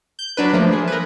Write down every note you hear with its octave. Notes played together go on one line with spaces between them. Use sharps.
G6
F#3 D4 B4
F3 A3 A#3
G#4
A#4 B4